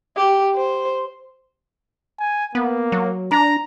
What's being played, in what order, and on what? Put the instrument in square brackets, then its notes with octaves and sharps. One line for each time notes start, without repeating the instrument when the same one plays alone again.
[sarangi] G4
C5
[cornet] G#5
[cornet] A#3 [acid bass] B3
[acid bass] F#3
[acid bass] D4 [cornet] A#5